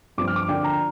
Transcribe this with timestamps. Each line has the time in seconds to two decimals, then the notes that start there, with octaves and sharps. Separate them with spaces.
0.18 G2 F3 C4 D6
0.28 F6
0.36 D6
0.48 D3 F3 A#3 D4 G5
0.64 A#5